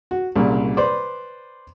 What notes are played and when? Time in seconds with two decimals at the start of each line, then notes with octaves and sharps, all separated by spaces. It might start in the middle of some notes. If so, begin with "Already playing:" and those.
0.11 F#4
0.36 C2 A#2 C#3
0.77 B4 C5 D5